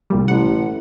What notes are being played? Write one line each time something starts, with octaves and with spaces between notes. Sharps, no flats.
C2 A#2 G3
A1 F#5